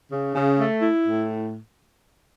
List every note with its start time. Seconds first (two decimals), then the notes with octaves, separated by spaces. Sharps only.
0.11 C#3
0.36 C#3
0.58 A3
0.82 E4
1.06 A2